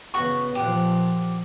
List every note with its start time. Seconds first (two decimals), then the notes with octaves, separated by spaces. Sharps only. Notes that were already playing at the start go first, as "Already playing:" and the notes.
0.14 C#3 B3 F#4 C#6
0.55 A#2 F3 G4 F#5